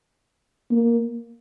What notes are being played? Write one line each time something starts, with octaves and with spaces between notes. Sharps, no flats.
A#3